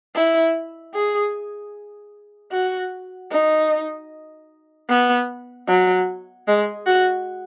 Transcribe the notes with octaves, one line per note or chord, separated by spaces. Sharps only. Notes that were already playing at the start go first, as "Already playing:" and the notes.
E4
G#4
F#4
D#4
B3
F#3
G#3
F#4